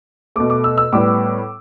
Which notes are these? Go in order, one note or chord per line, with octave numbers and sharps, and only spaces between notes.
B2 A3 D6
D6
E6
E6
A2 G3 B3 D6